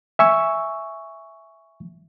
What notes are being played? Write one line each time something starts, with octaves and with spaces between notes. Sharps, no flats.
E5 G#5 C#6 E6